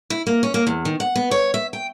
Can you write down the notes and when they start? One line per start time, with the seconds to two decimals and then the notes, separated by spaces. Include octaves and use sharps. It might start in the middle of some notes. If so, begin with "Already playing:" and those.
0.10 E4
0.27 A#3
0.43 C#4
0.54 A#3
0.67 E2
0.85 D#3
1.00 F#5
1.16 B3
1.31 C#5
1.54 E5
1.73 G5